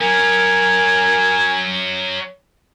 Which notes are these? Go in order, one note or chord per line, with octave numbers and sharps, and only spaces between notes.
F#3 C#4 A#4 G#5